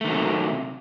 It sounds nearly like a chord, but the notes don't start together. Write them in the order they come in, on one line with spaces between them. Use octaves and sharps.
A3 D#3 F#3 C3